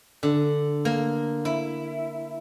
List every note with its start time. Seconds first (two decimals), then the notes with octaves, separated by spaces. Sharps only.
0.23 D3
0.85 A#3
1.45 E4